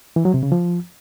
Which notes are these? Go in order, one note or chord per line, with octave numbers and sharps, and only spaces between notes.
E3
F#3
C3
C#3
F3